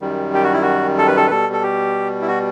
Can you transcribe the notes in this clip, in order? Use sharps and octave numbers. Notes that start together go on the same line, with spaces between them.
F#2 D#3 G3
G4
F#4
E4
F#4
A4
B4
A4
B4
B2 G3 A4
A4
G4
E4
F#4